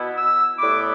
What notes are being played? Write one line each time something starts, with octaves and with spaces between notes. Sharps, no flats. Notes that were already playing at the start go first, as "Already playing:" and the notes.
Already playing: B2 B3 E4
E6
A2 G3 B3 E4 D6